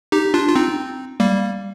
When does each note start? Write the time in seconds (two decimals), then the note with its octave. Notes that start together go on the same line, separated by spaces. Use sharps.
0.12 D#4 G4
0.34 D4 F4
0.49 F4
0.55 C4 D#4
1.20 G3 A#3